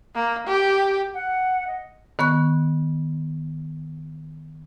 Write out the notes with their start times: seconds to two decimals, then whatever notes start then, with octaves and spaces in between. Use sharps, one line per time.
0.15 A#3
0.47 G4
1.14 F#5
1.68 D#5
2.19 D#3 B3 C#6 F#6